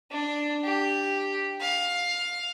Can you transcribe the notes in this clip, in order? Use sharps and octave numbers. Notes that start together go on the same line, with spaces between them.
D4
G4
F5